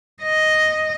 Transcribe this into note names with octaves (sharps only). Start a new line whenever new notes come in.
D#5